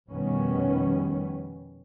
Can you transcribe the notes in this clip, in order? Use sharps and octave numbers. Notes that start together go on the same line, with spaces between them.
F1 B2 D#3 G3 B3 C#4